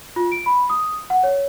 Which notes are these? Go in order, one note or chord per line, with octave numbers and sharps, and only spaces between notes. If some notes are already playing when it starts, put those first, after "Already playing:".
F4
D7
B5
D#6
F#5
C#5